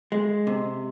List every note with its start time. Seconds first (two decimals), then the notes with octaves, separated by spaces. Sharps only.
0.12 G#3
0.47 C3